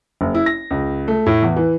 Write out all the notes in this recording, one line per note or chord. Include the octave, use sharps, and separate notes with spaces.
F#1
E4
A#6
C#2
A3
A2
E2
E3